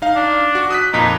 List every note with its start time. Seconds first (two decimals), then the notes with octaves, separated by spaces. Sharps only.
0.02 D#4 F5
0.16 D4
0.55 F#4
0.70 D#6 F#6 B6
0.93 F2 A#2 D#4 B6